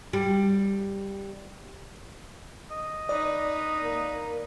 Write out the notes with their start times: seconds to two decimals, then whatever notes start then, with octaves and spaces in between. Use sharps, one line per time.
0.13 G3
2.71 D#5
3.09 D#4 B4 D5
3.83 A#3